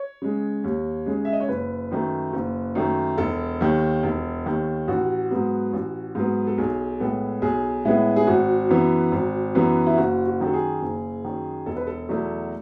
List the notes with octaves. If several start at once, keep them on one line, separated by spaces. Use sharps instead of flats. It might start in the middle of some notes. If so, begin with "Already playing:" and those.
Already playing: C#5
C#3 G#3
D#2
C#3 G#3
E5
D#5
C#5
F#1 B4
F#2 D#3 A3
F#1
F#2 D#3 A3
E1 A4
D#2 D#3
E1
D#2 D#3
A1 F#4
G#2 F#3 B3
A1
G#2 F#3 B3
A4
B1 G#4
A2 G#3 B3 A4
B1 G#4
A2 G#3 B3 E4
G#4
G#1 F#4
F#2 E3 B3
G#1
F#2 E3 B3
E4
F#1 F#4
F#4
F#2 D#3
A4
G#4
F#1
F#2 D#3
E1 A4
B4
A4
E2 B2 F#3 A3